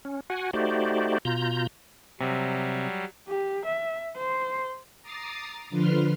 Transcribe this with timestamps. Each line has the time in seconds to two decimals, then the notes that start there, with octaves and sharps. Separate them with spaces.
0.05 C#4
0.30 F#4 F#5 G#5
0.53 A3 D#4 F#4 G4 C5 D5
1.25 B2 F4 A#5 G6
2.21 C3 F#3 G3
3.29 G4
3.66 E5
4.17 C5
5.02 A#5 D6 D#6 A6 C7
5.70 D3 F3 B4 C6 F6